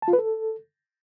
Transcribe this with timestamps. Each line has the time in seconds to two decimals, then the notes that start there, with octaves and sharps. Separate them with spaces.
0.02 A5
0.08 F4
0.13 B4
0.19 A4